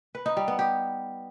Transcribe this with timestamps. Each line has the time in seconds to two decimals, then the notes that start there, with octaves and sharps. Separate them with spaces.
0.15 B4
0.26 D#4
0.37 G3
0.48 B3
0.59 G4